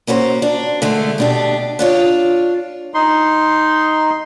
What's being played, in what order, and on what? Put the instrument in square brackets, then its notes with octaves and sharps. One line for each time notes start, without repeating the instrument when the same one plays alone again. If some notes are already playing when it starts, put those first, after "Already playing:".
[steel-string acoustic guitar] A#3 C#4 F#4 A4 C5
D4
D3 G#3 A3
B2 D4 G4
D4 F4 C#5
[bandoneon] D#4 C6